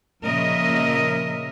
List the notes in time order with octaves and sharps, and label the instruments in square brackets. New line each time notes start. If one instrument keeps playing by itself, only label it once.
[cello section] A#2 C#3 F3 A#4 D#5 E5